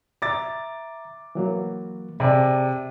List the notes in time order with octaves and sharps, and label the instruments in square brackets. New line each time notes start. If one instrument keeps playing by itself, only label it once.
[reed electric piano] E5 A#5 [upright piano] D6 A6
[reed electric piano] E3 F#3 A#3
[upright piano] C3 [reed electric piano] G#4 D5 A5